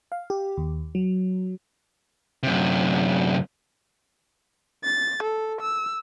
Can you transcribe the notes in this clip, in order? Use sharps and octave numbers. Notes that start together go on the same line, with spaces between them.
F5
G4
D#2
F#3
F#2 C3
A6
A4
E6